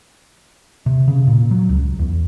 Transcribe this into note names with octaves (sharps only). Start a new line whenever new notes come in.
C3
C#3
A#2
F#3
C#2
E2